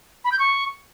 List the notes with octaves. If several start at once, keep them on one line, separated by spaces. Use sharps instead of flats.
B5
G6
C#6